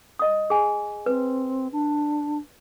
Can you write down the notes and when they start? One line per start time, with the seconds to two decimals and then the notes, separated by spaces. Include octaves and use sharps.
0.19 D#5 D#6
0.50 G#4 G#5
1.06 C4 B4
1.72 D4